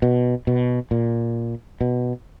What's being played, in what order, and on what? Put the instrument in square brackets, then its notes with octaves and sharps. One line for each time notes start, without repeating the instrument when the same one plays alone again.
[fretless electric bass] B2
B2
A#2
B2